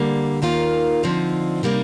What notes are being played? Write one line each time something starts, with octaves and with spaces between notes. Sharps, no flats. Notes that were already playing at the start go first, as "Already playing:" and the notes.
Already playing: D3 G3 A#3
D#2 D#3 A#3 F4
D3 F3 C4 D#4
C3 G3 A#3 D#4